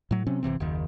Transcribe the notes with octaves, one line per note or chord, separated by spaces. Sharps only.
A2 F#3
C3 F#3 C4 C#4
G1 C3 E3 C4
F#1 D#2 D#3